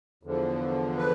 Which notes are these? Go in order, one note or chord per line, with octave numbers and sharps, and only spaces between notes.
E2 D3 F3
B4